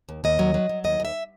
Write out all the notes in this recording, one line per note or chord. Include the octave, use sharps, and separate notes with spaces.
D#2
D#2 D#5
F#3
F#3
F#3
D#2 D#5
D#2 E5